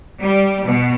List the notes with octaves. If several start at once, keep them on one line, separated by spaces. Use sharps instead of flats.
G3
B2